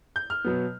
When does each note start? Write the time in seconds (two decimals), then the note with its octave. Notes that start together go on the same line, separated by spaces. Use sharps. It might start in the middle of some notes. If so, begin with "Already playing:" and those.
0.16 G6
0.30 F6
0.44 B2 F#3 B3